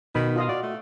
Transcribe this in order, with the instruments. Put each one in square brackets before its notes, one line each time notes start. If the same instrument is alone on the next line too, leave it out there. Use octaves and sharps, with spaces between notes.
[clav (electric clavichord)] B2 [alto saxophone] D#3 [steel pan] B5
[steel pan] F4 D#5 F5
[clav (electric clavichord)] F#4 [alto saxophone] D5
[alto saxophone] A3